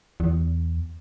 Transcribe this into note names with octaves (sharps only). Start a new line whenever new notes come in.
E2